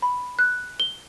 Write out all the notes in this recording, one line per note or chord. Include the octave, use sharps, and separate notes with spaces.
B5
F#6
G7